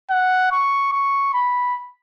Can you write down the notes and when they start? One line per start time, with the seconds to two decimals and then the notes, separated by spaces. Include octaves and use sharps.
0.11 F#5
0.52 C#6
0.92 C#6
1.34 B5